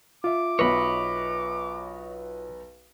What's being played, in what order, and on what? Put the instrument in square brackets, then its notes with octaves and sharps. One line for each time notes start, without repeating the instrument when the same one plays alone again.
[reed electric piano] F4 E5 [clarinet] D6
[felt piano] B1 B3 B4 [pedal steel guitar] C#5 D#5 B5